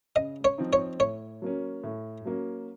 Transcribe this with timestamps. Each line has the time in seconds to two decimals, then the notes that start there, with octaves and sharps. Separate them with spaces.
0.16 C#3 D#5
0.44 C#5
0.58 F3 C4 D#4
0.73 C#5
0.99 A2 C#5
1.42 F#3 A#3 C#4
1.84 A2
2.25 F#3 A#3 C#4